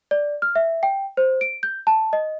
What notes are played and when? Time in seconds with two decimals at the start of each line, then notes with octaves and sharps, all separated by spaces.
0.11 D5
0.42 F6
0.56 E5
0.83 G5
1.17 C5
1.41 D7
1.63 G6
1.87 A5
2.13 D#5